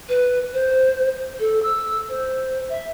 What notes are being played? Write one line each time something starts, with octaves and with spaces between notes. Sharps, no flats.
B4
C5
A4
E6
C5
E5